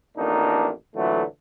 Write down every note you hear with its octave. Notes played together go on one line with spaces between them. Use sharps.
A1 F2 A#3 D4 D#4
A#2 D3 E3 F#3 A3